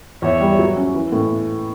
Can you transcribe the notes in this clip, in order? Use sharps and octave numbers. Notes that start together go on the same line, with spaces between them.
E2 C#5 E5
G3
F#3
C#4
E3
A2